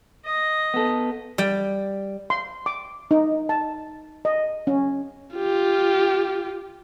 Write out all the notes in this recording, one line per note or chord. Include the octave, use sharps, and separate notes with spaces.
D#5
B3 A4
G3 G5
C6
D6
D#4
A5
D#5
C#4
F4 G4